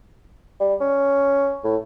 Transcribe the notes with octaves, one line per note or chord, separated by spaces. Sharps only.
G3
C#4
A2